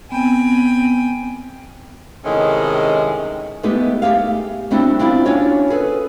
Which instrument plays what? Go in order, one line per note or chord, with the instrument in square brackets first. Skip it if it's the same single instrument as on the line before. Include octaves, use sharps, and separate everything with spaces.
[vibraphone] B3 C4 [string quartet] G5 G#5
[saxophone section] A2 C3 D#3 G#3 C#4
[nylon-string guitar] G#3 A3 B3 D#4 G4 G#4
A3 G4 G#4 F5
G3 A3 C4 D4 E4 F#4
C4 D4 E4 F4 G4
C#4 D4 F4 F#4 C#5
G#4 A4 B4